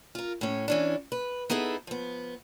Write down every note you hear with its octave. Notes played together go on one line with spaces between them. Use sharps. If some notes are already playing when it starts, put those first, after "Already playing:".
F4 A#4
A2 C#4
E3 C#4 D4
B4
B3 D#4 E4 G#4 A4
F3 B3